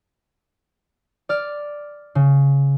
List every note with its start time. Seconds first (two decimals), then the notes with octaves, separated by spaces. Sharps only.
1.29 D5 F6
2.15 C#3